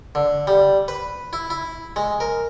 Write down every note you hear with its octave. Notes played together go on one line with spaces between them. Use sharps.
D3
G3
B4
E4
E4
G#3
A#4